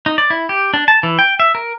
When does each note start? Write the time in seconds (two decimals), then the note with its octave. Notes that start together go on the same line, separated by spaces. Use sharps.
0.06 D#4
0.18 D5
0.30 E4
0.49 G4
0.74 D4
0.88 A5
1.03 E3
1.19 G5
1.40 E5
1.55 A#4